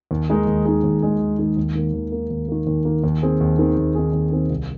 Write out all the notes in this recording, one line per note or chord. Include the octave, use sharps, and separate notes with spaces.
D#2
D#3 G#3 D#4 G#4
D#2
D#3 G#3 D#4 G#4
D#2
D#3 G#3 D#4 G#4
D#2
D#3 G#3 D#4 G#4
D#2
D#3 A#3
D#2
D#3 A#3
D#2
D#3 A#3
D#2
D#3 A#3
D#2
D#3 C4 G#4
D#2
D#3 C4 G#4
D#2
D#3 C4 G#4
D#2
D#3 C4 G#4
C2